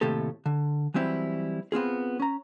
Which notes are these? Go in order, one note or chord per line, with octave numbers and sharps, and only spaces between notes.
D#2 A2 C3 G4 A4
D3
E3 F#3 G3 C4 E4
B3 C4 F4 G#4
C#4 A#5